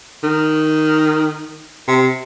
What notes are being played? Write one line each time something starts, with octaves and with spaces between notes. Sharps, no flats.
D#3
C3